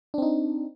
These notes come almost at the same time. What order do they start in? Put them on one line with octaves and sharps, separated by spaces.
D4 C4 D#4